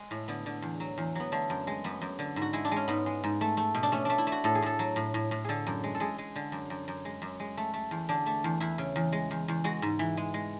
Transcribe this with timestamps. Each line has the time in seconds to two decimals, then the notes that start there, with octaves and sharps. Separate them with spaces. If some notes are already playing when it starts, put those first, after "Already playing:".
Already playing: G#3
0.11 A2
0.28 D3 B3
0.46 D3
0.62 E2
0.80 F#3
0.98 E2
1.15 F#3 B3
1.32 D3 A3
1.50 F#2
1.67 G#3
1.84 F#2 B3
2.01 F#2
2.19 D3
2.36 G#2
2.42 F#4
2.53 G#3 E4
2.65 D4
2.71 G#3
2.77 C#4
2.88 G#2 B3
3.06 G#3
3.24 G#2
3.41 A3
3.57 A3
3.75 B2
3.83 D4
3.92 A3 C#4
4.05 A3 D4
4.18 E4
4.27 A3
4.32 F#4
4.44 A2 A4
4.55 G#4
4.62 A2 A4
4.79 F#3
4.96 A2
5.14 A2
5.31 A2
5.45 D3 G#4 A4
5.67 F#2
5.84 G#3
5.95 A4
6.00 G#3 G#4
6.18 G#3
6.36 D3
6.52 F#2
6.70 F#2
6.88 F#2
7.05 G#3
7.22 F#2
7.40 G#3
7.57 A3
7.74 A3
7.91 E2
8.09 D3 D4
8.26 A3
8.44 E2
8.60 E2 E4
8.78 C#3
8.96 E2
9.12 G#3
9.31 E2
9.48 E2
9.64 G#3 F#4
9.82 G#2
9.99 E3
10.17 G#3
10.34 G#3